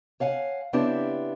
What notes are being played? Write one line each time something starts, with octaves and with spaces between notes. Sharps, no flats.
C#5 F5 F#5 G#5
C#3 B3 C4 D4 E4 G4